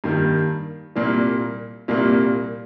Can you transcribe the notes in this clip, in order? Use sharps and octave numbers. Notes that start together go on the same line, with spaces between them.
G2 D#3 A#3
C2 A#2 G3 A#3
C2 A#2 G3 A#3